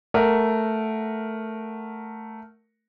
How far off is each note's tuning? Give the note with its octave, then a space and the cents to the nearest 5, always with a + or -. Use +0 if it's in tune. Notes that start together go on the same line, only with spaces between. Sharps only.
A3 +0 A#4 +0 F#5 +0